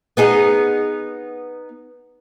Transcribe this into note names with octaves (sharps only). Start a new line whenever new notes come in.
B3 D#4 G#4